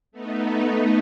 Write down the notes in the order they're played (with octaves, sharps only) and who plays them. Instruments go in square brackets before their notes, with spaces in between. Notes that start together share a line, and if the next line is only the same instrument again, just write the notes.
[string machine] A3 B3 D#4